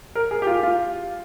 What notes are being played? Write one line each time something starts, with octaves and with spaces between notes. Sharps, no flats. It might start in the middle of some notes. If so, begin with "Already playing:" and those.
A#4
G#4
G4
F4
F4